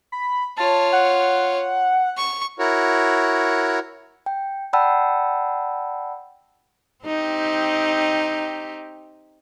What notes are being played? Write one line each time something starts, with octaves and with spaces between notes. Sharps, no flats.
B5
F4 C#5 A5
F#5
C#6
E4 F#4 A#4 C#5
G5
D5 F#5 G5 A5 B5 E6
C4 D#4 G4